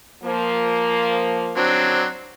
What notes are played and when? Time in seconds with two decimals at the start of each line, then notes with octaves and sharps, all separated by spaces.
0.23 F3 A#3
1.57 F#3 C4 D4